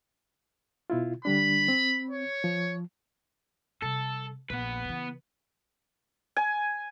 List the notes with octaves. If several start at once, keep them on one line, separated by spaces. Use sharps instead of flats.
B2 E4 F4
D3 G3 D4 B5
C4
C#5
F3
C3 G3 A4
A#1 B3 B4
C#3 E3
G#5